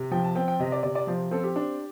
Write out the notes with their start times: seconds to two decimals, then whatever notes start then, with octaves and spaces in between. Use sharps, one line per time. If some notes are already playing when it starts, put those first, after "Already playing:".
Already playing: C3
0.11 F3 G5
0.24 A5
0.35 C4 G5
0.48 G5
0.60 C3 D#5
0.72 D5
0.83 C3 D5
0.95 D5
1.07 F3 C5
1.31 C4 A4
1.44 G4
1.56 D4